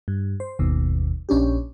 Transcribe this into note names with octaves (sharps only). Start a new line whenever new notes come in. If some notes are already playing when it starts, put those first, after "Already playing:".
G2
C5
G1 D#2 B2
A#1 C#4 D4 G4